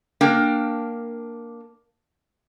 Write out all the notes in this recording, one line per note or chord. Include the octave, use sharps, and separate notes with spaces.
A#3 D4 A#4 G5